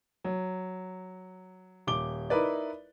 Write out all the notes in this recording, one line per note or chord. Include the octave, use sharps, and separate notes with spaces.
F#3
D#1 D6 G7
D#4 E4 A#4 B4 D5